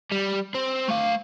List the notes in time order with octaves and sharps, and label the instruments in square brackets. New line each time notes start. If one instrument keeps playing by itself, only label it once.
[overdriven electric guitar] G3
C4
A3 F5